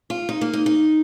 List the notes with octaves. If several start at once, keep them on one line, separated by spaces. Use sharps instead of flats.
F4
D#4
A#3
D#4
D#4